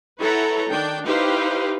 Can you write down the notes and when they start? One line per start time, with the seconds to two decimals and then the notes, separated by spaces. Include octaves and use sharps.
0.19 E4 A4 B4 C#5 F#5 A#5
0.71 D#3 D4 G5
1.07 D#4 E4 G4 B4 C5 F5